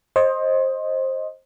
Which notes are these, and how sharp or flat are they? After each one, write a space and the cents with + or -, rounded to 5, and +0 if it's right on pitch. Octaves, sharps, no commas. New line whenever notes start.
C5 +20 D#5 +0